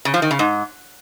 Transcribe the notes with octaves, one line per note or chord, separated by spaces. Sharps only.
C#3
F3
D#3
C#3
G#2